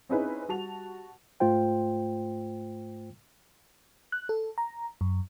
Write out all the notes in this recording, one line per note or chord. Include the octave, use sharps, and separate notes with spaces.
C4 C#4 D#4 E4 G#4 B4
G3 F#4 A5 F7
G#2 A3 F4 C5 G5
F#6
A4
A#5
F#2